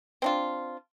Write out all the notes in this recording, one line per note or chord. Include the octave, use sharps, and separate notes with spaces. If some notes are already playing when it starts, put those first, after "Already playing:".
C4 D4 F4